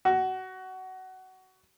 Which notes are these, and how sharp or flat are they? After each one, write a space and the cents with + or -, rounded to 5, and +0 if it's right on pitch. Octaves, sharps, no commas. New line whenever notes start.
F#4 +20